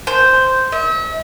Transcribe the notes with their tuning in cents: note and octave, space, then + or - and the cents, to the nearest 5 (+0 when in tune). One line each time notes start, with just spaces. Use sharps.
C5 -5
E5 -40